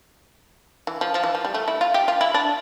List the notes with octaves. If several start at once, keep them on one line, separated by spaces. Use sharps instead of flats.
E3
F3
F3
E3
F3
G3
A3
E4
F4
G4
F4
E4
D4